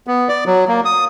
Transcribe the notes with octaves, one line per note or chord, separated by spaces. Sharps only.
B3
D5
F#3
A#3
D#6